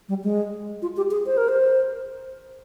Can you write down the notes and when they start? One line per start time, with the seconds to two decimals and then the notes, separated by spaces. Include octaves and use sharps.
0.09 G3
0.24 G#3
0.82 F4
0.97 G4
1.11 G#4
1.26 C5
1.37 A#4
1.48 C5